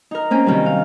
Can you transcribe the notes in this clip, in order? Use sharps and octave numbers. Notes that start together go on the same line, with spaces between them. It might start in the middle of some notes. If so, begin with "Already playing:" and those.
D#4 A#4
A#3 C4 C#4
C3 D#3 F#3 G3
F5